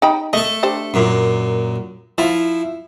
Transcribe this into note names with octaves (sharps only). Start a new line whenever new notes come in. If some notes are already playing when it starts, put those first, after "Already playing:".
D#4 G5 B5
A3 A4 D#5
D4 G4 C5
F#2 A#2
F3 E4 F4